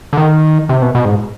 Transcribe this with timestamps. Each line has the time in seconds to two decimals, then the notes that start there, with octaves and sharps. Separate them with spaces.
0.13 D3
0.17 D#3
0.69 C3
0.82 B2
0.95 B2
1.05 G#2